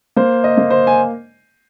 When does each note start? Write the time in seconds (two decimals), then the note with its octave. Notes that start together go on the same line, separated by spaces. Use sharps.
0.16 A#3 C5
0.44 D#5
0.57 A#3
0.70 C5
0.87 G#5